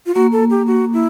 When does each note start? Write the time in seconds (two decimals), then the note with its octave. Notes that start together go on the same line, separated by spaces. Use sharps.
0.06 F4
0.15 A#3 F#4
0.32 A4
0.50 G4
0.67 F#4
0.93 E4